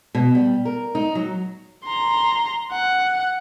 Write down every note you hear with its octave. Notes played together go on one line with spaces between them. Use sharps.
B2
G3
A#4
D#4
F#3
A#5 C6
F#5